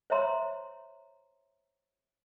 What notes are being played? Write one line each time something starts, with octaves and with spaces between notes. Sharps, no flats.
C5 C#5 E5 A#5 C6